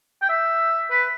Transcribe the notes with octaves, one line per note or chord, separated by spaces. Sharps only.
G5
E5
B4